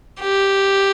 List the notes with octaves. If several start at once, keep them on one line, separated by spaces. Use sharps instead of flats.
G4